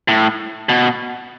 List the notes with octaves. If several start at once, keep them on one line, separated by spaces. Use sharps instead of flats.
A2
B2